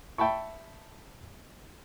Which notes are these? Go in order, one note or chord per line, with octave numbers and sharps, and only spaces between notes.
E5 G5 A5 B5 C#6